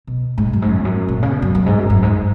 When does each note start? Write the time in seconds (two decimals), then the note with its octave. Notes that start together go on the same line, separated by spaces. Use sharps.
0.07 B2
0.38 G#2
0.53 F#2
0.62 G#2
0.69 F#2
0.79 E2
0.85 F#2
1.08 A#2
1.22 C#3
1.31 B2
1.42 F#2
1.55 F#2
1.66 G#2
1.78 F#2
1.90 F#2
2.03 G#2